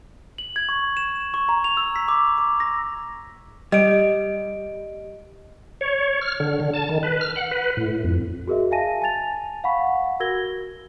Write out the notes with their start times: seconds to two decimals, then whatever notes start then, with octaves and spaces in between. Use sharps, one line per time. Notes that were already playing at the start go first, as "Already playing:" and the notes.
0.38 F#7
0.56 G#6
0.69 C#6
0.97 E7
1.34 C#6
1.49 A#5
1.64 F7
1.77 E6
1.96 B6
2.08 D6
2.38 D6
2.60 A#6
3.72 G3 D#5 D7
5.81 C#5
6.22 F6
6.40 D3
6.60 D3
6.73 A5
6.89 D#3
7.03 B4
7.21 F6
7.36 F#5
7.51 B4
7.77 A2
8.04 F2
8.47 F#4 G#4 A#4 D#5 E5
8.71 E5 F5 G#5 A5 A#6 D#7
9.02 G#5 A5 A6 F7
9.64 F5 F#5 G#5 B5 C#6 B6
10.20 F#4 A#4 E6 G#6 A#6 G7